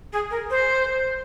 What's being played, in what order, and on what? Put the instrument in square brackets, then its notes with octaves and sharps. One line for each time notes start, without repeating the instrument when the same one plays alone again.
[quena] G#4
A#4
C5